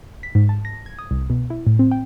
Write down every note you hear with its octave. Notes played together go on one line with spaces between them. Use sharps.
B6
G#2
A5
A#6
G#6
D#6
C2
B2
E4
A2
C4
G5